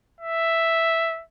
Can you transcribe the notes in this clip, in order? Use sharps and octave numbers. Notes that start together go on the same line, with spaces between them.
E5